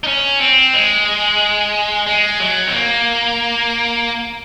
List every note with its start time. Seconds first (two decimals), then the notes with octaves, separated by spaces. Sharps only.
0.04 D#4
0.07 C#4
0.40 C4
0.74 G#3
2.07 G#3
2.40 F#3
2.67 C4
2.72 A#3